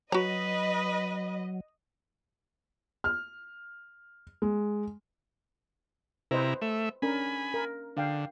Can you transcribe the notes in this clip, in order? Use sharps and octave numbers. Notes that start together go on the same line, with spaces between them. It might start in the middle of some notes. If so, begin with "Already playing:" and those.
F#3 F#4 B4 D#5 A#5
F6
G#3
C3 E4 B4 C5 D#5 A#5
A3 E5
C#4 D4 A#4 G#5 B5
A#4
D3 D4 F5 G5